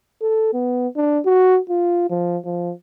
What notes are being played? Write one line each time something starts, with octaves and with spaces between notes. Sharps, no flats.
A4
B3
D4
F#4
F4
F3
F3